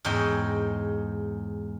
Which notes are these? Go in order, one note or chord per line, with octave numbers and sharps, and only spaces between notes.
E2 G#2 C#5 D#5 G5